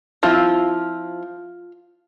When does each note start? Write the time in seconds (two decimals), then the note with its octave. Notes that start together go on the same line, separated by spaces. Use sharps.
0.23 F3 C4 E4 F4